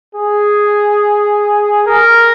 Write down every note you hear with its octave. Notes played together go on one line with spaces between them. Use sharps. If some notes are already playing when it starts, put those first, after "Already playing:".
G#4
A#4